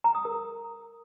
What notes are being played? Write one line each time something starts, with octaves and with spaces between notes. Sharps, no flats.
A#5
D#6
A#4